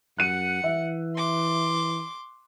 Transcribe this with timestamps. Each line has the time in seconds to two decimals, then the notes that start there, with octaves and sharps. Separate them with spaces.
0.19 F#2 F#5 F#6 C#7 D#7
0.64 E3 E5
1.16 C6 D6